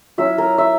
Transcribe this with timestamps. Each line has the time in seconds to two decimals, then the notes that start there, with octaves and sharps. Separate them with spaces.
0.18 F#3 C#4 E4 E5
0.38 A#4
0.58 E5